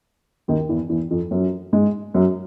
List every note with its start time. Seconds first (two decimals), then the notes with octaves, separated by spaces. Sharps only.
0.48 D#2 D#3
0.69 E2 E3
0.89 E2 E3
1.11 F2 F3
1.31 F#2 F#3
1.73 G#2 G#3
2.14 F#2 F#3